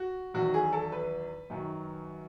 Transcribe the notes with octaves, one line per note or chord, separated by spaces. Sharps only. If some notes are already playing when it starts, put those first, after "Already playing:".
Already playing: F#4
E2 D#3 F#3 F#4
G#4
A4
B4
F#2 D#3 F#3